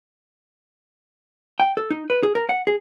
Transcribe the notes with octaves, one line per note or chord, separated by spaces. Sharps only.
G5
A4
D#4
B4
G#4
A#4
F#5
G#4